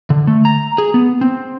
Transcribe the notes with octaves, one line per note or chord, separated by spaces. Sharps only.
D3
A3
A#5
G#4
B3
C4